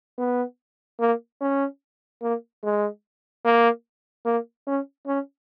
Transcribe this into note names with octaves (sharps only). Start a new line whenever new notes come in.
B3
A#3
C#4
A#3
G#3
A#3
A#3
C#4
C#4